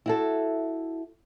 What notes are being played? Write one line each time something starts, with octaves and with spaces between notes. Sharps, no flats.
E4 F#4 A4